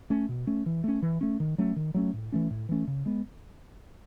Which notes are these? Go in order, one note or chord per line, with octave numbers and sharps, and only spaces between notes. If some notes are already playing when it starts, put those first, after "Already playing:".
A3 C#4
B2
A3 C#4
E3
A3 C#4
E3
A3 C#4
D#3
F#3 A3 C#4
D#3
F#3 A3 C#4
A2
E3 A3 C#4
A2
E3 A3 C#4
C#3
G#3 B3